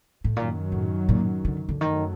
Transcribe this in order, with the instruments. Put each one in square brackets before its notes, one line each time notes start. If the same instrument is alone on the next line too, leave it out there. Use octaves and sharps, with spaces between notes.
[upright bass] A2
[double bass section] F#2 D#3 F#3 [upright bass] A#2
[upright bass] A2
A#2
D3
D3
[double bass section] F#2 F#3 A3 [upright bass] D#3